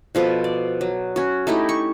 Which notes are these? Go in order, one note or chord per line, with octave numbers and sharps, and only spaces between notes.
B2 F3 A4 B4
D5
F#3
C#4 F#4
A3 D#4 E4 G4
C#6